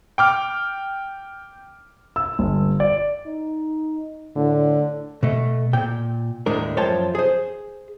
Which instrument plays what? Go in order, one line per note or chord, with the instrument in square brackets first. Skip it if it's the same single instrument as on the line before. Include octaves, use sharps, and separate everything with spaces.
[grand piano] G5 D6 F6
E6
G1
D5
[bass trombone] D#4
[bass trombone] A2 [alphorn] D3
[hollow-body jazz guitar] B2 A3
A#2 G5
D#2 A2 G#3 D4 A#4
F#2 F3 C#5 G5 A5 C6
G#4 C5